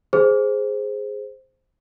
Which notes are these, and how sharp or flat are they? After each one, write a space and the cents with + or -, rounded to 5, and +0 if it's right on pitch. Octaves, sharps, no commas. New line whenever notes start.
G#4 +0 C5 +0